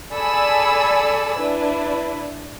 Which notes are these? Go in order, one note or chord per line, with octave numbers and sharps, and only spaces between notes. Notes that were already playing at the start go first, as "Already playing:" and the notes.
G#4 A4 D5 G#5 B5 E6
D4 E4 B4